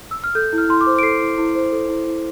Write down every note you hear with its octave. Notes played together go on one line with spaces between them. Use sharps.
E6
F6
A4 G6
E4
F6
E4 C6
D6
C5
D7
A4 C7
E4
E4
C5
A4
E4
E4